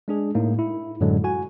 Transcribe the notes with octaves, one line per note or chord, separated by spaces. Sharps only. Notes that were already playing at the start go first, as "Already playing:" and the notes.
G#3 D4 G#4
A2 A#3 D#4
E4
F#2 A2 D3 F#3 G#3
F#4 G#5